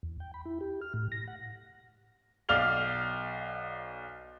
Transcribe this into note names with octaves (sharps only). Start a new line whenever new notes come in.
E2
G5
B5
E4
G4
F6
A2
A#6
F#5
B1 D5 F5 F6 F7 G7